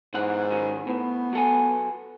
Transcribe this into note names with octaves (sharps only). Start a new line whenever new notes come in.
B1 G#2 E3 F#5
D#3 F#3 C#4
A2 B3
F#3 A4 G#5